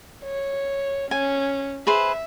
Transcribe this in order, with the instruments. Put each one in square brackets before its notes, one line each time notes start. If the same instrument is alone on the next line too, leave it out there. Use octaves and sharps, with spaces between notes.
[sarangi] C#5
[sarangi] C#4 [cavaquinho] G#5
[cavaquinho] G#4 B4 C5 [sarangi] E5